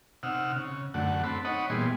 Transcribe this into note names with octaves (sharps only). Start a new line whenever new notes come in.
C3 D#4 F#5 E6 F6
C#3
F#2 D3 A3 F#5
C4 A4 B5
D#4 C#5 D#5 F#5 B5
A#2 E3 G3 B3 G#4 C6